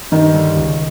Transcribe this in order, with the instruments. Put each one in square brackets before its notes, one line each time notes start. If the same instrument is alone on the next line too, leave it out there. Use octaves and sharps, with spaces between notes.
[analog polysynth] G2 [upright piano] D#3
[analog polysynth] D3 G3
C#2